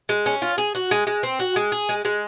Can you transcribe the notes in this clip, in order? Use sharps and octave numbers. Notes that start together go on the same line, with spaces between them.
G#3
C#4
F4
G#4
F#4
G#3
G#3
C4
F#4
G#3
G#4
G#3
G#3